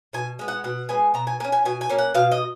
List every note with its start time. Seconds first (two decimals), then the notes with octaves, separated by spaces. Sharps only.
0.13 B2 G#5
0.39 G#3 B3
0.48 F#5
0.64 B2 F#5
0.89 G#3 B3 G#5
1.14 B2 A#5
1.27 G#5
1.40 A#3 G#5
1.44 C#4
1.52 G#5
1.65 B2 G#5
1.81 G#5
1.89 A#3 C#4
1.98 F#5
2.15 B2 F5
2.32 D#5